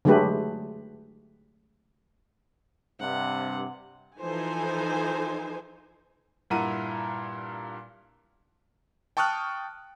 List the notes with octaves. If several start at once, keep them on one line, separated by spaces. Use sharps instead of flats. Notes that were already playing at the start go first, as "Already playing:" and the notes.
D3 F#3 G#3 A3 G4 B4
G2 C3 F#5
E3 F3 D#4 A4 C5 G#5
G2 A#2 E4 F#5 A#5 D#7
G5 A5 C#6 D#6 F6 F#6